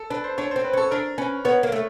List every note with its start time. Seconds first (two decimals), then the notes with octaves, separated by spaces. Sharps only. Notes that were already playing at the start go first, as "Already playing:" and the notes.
Already playing: A4
0.10 D4 B4
0.24 C5
0.38 D4 C#5
0.51 C4 C5
0.64 B4
0.73 C#4 A4
0.91 D4 A#4
1.18 C#4 B4
1.45 B3 C#5
1.63 A#3
1.72 A3